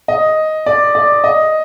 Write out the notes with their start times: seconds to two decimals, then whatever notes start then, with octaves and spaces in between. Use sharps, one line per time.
0.08 D#5
0.66 D5
0.95 D5
1.24 D#5